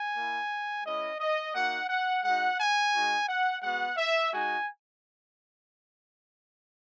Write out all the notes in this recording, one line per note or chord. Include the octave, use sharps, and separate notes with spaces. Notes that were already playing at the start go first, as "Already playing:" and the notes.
Already playing: G#5
A#3 E4
G#3 C#4 E4 D#5
D#5
A#3 D#4 F#4 F#5
F#5
G#3 D#4 F#4 F#5
G#5
G#3 D#4 F#4
F#5
G#3 B3 F#4 F#5
E5
G#3 D#4 F#4 G#5